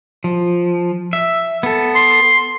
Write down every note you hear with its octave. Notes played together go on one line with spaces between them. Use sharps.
F3
E5
B3 A4
C6